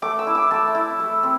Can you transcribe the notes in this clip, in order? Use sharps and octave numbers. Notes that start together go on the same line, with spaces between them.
A3 D6
E6
E4
D6
A3 A5
E4
A3
C4